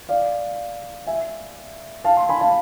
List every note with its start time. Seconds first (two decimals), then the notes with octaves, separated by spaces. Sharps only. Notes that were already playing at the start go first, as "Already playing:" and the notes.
0.09 D5 F5
1.07 E5 G#5
2.04 F5 A5
2.17 A5 C6
2.29 G#5 B5
2.41 F5 A5